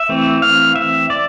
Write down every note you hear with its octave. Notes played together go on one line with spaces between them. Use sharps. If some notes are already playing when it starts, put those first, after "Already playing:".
Already playing: E5
E3 A3 C4
F5
E5
D5